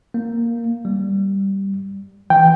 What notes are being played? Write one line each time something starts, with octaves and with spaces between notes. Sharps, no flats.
A#3
G3
E3 G5